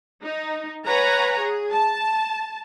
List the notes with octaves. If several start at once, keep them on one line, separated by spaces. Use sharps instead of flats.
D#4
B4 C#5 F#5 G#5 A#5
G#4
A5